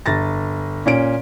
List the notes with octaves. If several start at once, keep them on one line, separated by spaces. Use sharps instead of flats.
G1 A6 A#6
A#2 C#4 D7